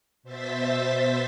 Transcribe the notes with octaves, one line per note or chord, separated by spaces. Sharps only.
B2 C5 E5 A6 B6